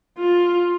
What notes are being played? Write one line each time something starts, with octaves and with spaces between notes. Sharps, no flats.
F4